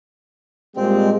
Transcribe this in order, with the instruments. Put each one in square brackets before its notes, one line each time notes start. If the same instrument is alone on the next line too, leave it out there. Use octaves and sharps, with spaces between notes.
[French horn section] A#2 G3 G#3 [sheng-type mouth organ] C4